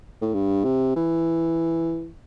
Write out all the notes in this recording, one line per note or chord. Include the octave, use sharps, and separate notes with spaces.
A2
G2
C3
E3